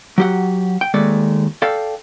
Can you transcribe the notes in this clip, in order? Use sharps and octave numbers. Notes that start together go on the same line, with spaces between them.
F#3 G4 F#5
G5
D#2 G#3 A3 D5
A4 D5 F5 G5